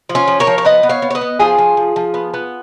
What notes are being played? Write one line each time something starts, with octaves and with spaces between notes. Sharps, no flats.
F3
C#4 F4
F3
A#4 C#5
F3
C#5
B3 B4 D#5
B3
C#5 F5
B3
C#5
B4 D#5
B3
F3 F4 G#4
F3
F3
F3
B3
B3